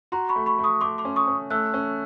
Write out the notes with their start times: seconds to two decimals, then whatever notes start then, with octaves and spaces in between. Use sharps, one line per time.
0.12 F#4 A#5 C6
0.29 B5 C#6
0.36 A3
0.46 B5 C#6
0.59 A3
0.64 C#6 D#6
0.81 A3 C6 D6
0.98 C6 D6
1.05 C#4
1.16 C#6 D#6
1.27 C#4
1.50 A3 E6 F#6
1.74 C#4